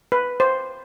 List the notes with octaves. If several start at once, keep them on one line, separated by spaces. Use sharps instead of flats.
B4
C5